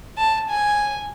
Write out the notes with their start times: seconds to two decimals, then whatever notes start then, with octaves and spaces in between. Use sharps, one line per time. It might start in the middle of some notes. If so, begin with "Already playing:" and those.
0.18 A5
0.50 G#5